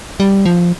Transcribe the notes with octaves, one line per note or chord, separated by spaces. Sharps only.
G3
F3